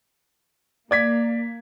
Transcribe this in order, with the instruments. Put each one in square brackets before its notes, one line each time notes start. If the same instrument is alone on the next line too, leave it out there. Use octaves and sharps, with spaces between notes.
[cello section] A#3 [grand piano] D5 G#6 B6